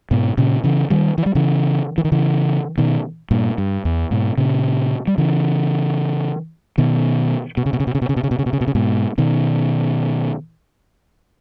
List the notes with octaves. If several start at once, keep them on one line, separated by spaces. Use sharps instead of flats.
G#2 B2
A#2 C#3
C#3 E3
D#3 G3
E3
G3
C#3 E3
E3
D#3
C#3 E3
B2 D#3
G2 A#2
G2
E2
G#2 B2
A#2 C#3
G3
C#3 E3
B2 D#3
B2
C#3
B2
C#3
B2
C#3
B2
C#3
B2
C#3
B2
C#3
B2
C#3
B2
C#3
G#2 B2
B2 D#3